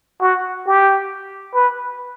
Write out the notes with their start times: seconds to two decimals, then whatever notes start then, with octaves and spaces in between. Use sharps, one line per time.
0.21 F#4
0.66 G4
1.55 B4